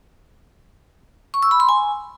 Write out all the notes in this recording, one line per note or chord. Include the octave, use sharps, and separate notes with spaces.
C#6
E6
B5
C6
G#5